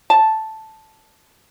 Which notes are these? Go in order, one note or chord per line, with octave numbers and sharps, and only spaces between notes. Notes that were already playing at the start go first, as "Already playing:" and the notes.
A5